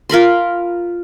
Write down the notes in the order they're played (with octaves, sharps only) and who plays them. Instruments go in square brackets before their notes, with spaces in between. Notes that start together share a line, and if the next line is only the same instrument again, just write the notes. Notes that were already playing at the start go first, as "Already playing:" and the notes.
[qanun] F4 A#4 B5 C6